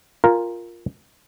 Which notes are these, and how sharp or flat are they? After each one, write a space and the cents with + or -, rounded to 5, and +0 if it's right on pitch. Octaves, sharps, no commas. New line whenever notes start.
F4 +0 A#4 +0 G#5 -35